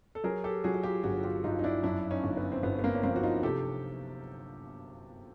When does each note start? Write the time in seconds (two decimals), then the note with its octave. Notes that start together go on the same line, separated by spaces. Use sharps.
0.15 A4
0.24 F#3 G#4 A#4
0.44 G4 A4
0.64 F#3 F#4 G#4
0.74 G#4
0.83 F4 G4
1.04 G1 F#4 G#4
1.24 F4 G4
1.44 G2 D#4 F4
1.59 D#4
1.64 D4 E4
1.83 F#2 D4 E4
2.10 C#4 D#4
2.24 G1
2.37 B3
2.52 C4
2.63 G1 B3
2.79 B3
2.83 A#3 C4
2.95 C#4
3.03 F3 A#3 C4
3.16 F#4
3.23 D#4 F4
3.43 C3 G4 A4